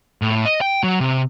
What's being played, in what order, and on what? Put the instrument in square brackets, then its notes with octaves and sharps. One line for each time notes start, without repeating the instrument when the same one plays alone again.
[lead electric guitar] A2
D#5
G5
F#3
C3